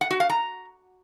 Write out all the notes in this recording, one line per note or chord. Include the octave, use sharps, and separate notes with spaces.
F#5
F#4
F5
A#5